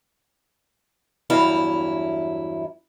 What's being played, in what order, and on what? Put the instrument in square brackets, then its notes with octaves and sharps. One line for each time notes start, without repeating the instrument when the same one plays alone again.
[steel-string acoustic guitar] E2 G2 F#3 E4 F5